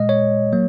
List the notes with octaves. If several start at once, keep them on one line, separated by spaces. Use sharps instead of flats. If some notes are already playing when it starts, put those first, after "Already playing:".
Already playing: A#2 G#3 D#5
C#5
F#3 A#3